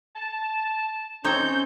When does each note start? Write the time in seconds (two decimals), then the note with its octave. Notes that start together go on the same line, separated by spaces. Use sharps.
0.16 A5
1.24 C4 C#4 D#4 C#5 G6